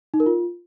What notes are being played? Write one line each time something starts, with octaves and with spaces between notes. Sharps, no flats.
D#4
A#4
F4